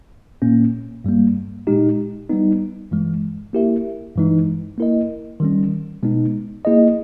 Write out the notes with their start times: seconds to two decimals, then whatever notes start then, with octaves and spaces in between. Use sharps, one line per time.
0.42 A#2 A#3 C#4
1.04 G2 G3 A#3
1.67 A#2 G#3 D#4 G4
2.29 G3 B3 D#4
2.91 G2 E3 G#3
3.53 A#3 E4 G4 A#4 E5
4.15 G2 E3 G#3 D#4
4.78 A#3 E4 A#4 D#5
5.40 D#3 G3 C#4
6.03 B2 G#3 B3 D#4
6.65 A#3 E4 G#4 D#5